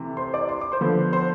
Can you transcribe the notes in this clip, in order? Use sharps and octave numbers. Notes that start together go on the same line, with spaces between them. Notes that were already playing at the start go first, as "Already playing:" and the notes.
Already playing: C3 E3 A3
C5 C6
D5 D6
C6
D6
C5 C6
D3 F3 B3
C5 C6